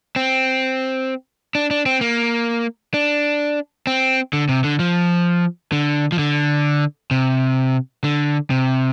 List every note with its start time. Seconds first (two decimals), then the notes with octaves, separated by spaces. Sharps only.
0.16 C4
1.55 D4
1.71 D4
1.86 C4
2.01 A#3
2.94 D4
3.87 C4
4.33 D3
4.49 C3
4.64 D3
4.79 F3
5.72 D3
6.12 F3
6.19 D3
7.11 C3
8.04 D3
8.50 C3